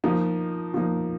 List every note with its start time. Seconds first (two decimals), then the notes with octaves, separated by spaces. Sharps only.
0.04 F3 A#3 D#4
0.74 F3 A#3 D#4